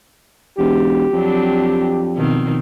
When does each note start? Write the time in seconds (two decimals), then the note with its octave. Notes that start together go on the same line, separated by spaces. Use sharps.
0.58 E1 G4
1.13 F2 F#3 C4 D4
2.16 B2 D#3 C4